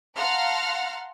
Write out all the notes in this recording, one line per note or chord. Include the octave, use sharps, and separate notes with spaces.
F5 F#5 A5 A#5 C6 F6